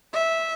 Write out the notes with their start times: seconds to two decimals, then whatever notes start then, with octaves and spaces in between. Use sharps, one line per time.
0.13 E5